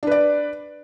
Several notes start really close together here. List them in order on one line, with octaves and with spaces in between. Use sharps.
D4 B4 D5